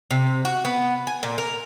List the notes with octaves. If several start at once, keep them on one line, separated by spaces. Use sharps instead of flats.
C3
F#4
B3
G#5
A#2
A#4